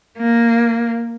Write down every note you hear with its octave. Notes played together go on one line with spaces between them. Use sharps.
A#3